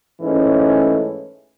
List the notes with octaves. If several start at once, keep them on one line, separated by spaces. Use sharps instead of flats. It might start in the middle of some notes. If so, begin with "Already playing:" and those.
G#2 E3 A3 C#4